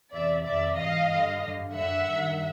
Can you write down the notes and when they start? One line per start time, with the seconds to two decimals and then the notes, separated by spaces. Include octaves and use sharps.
0.12 E2 C3 E3 D5 E5
0.45 F2 C3 D#3 D5 E5
0.77 G#2 E3 D#5 F5
1.10 G2 D3
1.42 G2 D3
1.74 F#2 D3 E5 F#5
2.06 G2 D#3